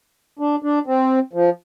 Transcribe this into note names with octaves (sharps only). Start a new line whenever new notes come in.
D4
D4
C4
F3